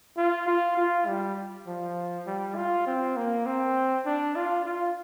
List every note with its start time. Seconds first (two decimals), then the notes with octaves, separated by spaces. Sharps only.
0.17 F4
0.48 F4
0.77 F4
1.07 G3
1.67 F3
2.27 G3
2.56 F4
2.87 C4
3.17 A#3
3.46 C4
4.06 D4
4.36 F4
4.65 F4